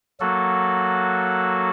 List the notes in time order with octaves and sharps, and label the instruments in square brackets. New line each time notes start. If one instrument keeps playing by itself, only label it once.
[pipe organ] F#3 A#3 F#4 A4